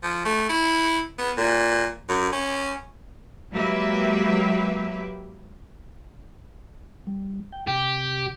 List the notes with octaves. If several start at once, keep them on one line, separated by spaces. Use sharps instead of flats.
F3
A3
E4
B3
A#2
F#2
C#4
F#3 G#3 A#3 G4 B4 E5
G3
G5
C3 G4